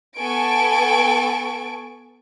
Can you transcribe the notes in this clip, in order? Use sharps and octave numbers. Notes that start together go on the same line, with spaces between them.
B3 A4 G#5 C#6 D7